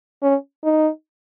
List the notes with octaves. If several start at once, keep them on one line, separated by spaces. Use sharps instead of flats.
C#4
D#4